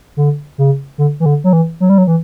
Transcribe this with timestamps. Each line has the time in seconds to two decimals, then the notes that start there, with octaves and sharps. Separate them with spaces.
0.17 D3
0.58 C#3
0.98 D3
1.20 E3
1.26 D3
1.44 F#3
1.53 E3
1.80 F#3
1.90 G3
1.98 F#3
2.07 E3